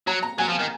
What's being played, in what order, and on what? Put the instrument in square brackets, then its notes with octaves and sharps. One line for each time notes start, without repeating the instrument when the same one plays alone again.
[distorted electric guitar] F#3 [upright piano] A#5
[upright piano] A#5
[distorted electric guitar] F#3 [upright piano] G#5
[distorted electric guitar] F3
D#3